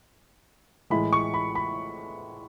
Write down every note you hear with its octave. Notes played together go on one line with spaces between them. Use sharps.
A2 E3 G#3 B5
C#6
B5
B5